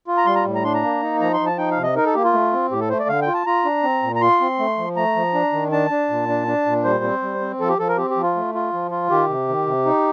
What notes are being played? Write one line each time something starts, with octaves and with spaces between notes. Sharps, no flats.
F4
A#5
G3 C6
A#5
A2
A#5
D4 C6
A#5
A#3
D#4
F3 A#5
C6
F3
A5
D#4 G5
F5
C3
D#5
D#4 A#4
A4
A#3 G4
F4
A3
C4
A2 G4
A4
A3 C5
D5
D3 F5
G5
F4
A5
F4 A#5
D4
C4
A#2
A#5
F4 C6
C4
A3
F3
A3 A#5
F3
D4
D#3
D4 A5
D4
A#2
D4
D4
A#2
G3 C5
C4
G3
C4
F3 A4
G4
F3 A4
A#4
C4 G4
G4
F3
F4
A3
F4
F3
F4
D#3 G4
C3
D#3
C3
D#4